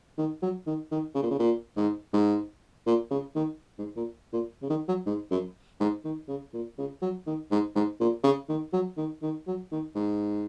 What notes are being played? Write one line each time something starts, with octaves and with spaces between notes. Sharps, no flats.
D#3
F#3
D#3
D#3
C#3
A#2
C#3
A#2
G#2
G#2
A#2
C#3
D#3
G#2
A#2
A#2
C#3
D#3
F#3
G#2
F#2
G#2
D#3
C#3
A#2
C#3
F#3
D#3
G#2
G#2
A#2
C#3
D#3
F#3
D#3
D#3
F#3
D#3
G#2